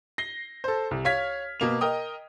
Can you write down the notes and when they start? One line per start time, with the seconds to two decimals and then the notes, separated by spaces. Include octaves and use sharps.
0.18 A#6 C7 G7
0.64 A4 C5
0.91 C2
1.05 C#5 F5 F6 G#6 B6
1.60 B2 A#3 F7
1.81 A#4 D#5 G5 D#6